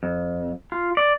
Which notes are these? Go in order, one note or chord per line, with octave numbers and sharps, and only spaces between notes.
F2
F4
D5